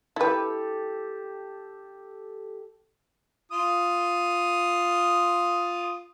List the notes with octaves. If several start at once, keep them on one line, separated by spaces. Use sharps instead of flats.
E4 G4 A4 B4
F4 D#6